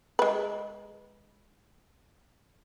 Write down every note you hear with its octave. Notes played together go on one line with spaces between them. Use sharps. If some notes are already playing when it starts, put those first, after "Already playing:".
G#3 B4